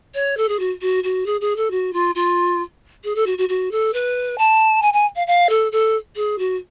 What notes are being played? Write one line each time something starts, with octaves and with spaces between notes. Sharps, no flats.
C#5
A4
G#4
F#4
F#4
F#4
G#4
G#4
A4
F#4
F4
F4
G#4
A4
F#4
F#4
F#4
A4
B4
A5
G#5
G#5
F5
F5
A4
A4
G#4
F#4